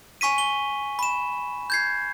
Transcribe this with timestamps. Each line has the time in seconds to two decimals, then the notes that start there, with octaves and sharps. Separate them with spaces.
0.21 G#5 C#6 B6 D#7
0.38 G7
0.99 B5 E7
1.70 G6 G#6 C7